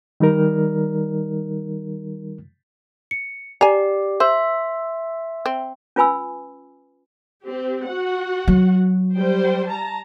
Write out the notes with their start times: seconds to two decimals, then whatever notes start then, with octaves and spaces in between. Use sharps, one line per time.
0.20 D#3 G3 D#4 A#4
3.11 C#7
3.61 G4 D5 G#5 A#5
4.20 C5 E5 C6 E6
5.46 C4
5.96 C#4 F4 B4 G#5 B5 E6
7.44 C4 G4
7.87 F#4 F#5
8.48 F#3
9.17 G3 C5 G5
9.67 A5 A#5